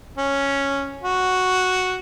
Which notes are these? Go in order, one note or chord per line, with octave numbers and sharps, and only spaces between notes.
C#4
F#4